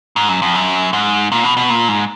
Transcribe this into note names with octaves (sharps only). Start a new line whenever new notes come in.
G#2
F#2
F2
F#2
G#2
A#2
B2
B2
A#2
G#2